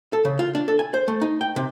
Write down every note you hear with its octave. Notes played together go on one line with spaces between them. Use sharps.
A4
C#3
F4
D4
A4
G#5
C5
A3
D#4
G5
C3